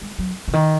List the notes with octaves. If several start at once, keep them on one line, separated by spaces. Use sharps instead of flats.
G#3
F#3
C#3
D#3